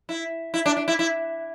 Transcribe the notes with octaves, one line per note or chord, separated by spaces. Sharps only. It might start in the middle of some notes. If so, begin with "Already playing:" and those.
E4
E4
D4
D4
E4
E4